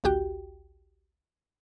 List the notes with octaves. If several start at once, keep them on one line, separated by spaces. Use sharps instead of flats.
A1 D2 F#4 G4 G5